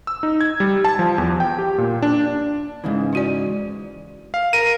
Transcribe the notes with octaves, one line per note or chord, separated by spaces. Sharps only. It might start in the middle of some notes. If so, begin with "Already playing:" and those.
E6
D#4
G#6
G3
A5
F3
E2
G5
G4
A#2
D4
G#2 C#3 E3
E4 F#4 D5
F5
A#4 D#7